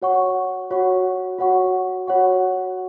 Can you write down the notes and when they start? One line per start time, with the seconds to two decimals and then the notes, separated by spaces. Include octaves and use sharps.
0.02 F#4 C#5 F#5 C#6
0.71 F#4 C#5 F#5 C#6
1.38 F#4 C#5 F#5 C#6
2.07 F#4 C#5 F#5 C#6